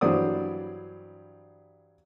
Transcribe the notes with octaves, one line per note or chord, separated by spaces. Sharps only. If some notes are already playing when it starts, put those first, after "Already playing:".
G2 E3 F#3 C5 D5 D#6